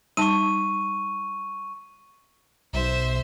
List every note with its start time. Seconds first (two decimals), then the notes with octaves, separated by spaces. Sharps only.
0.17 G3 D#4 A5 C#6 D#7
2.73 B1 C5 E5